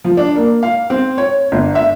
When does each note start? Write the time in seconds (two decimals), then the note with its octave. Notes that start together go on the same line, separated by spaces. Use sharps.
0.04 F3
0.17 D4
0.35 A#3
0.63 F5
0.90 C4
1.18 C#5
1.52 G1
1.75 E5